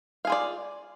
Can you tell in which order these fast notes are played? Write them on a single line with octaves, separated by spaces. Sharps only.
F5 G#4 F4 D5